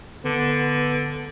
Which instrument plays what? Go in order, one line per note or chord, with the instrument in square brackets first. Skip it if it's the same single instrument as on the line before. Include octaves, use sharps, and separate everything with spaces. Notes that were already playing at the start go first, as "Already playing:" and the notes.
[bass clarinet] D3 [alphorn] B3